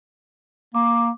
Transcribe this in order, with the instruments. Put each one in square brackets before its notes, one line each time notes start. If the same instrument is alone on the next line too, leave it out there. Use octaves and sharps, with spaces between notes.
[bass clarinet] A#3 [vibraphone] D6